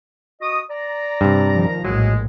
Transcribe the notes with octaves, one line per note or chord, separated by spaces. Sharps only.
F#4 D#5 D#6
D5 A#5
G2 C3
D#3 F3
A#1 A2 F#3 G#3